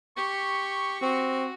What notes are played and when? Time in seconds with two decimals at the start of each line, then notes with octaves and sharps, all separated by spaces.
0.17 G4 C#6
1.02 C4 F#4